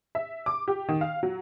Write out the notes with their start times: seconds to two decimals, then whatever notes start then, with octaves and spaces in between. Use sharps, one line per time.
0.15 E5
0.46 D6
0.68 G4
0.89 D#3
1.01 F5
1.23 F#3